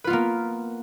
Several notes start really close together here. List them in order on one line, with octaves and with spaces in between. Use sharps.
B4 F4 B3 A#3